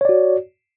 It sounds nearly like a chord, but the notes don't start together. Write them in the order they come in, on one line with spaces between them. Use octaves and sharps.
C#5 D5 F#4